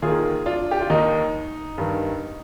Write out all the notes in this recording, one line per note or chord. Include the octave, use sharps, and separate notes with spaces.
D#2 D#3 F4 G#4
D4 F4
G4
F4
D#2 D#3 D#4
G2 D#3